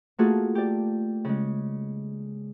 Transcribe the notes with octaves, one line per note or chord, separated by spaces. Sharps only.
A3 A#3 F4 F#4 G#4 A4
G4 D5
C#3 G#3